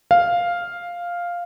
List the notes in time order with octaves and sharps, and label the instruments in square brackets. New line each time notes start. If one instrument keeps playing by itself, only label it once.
[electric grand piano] F5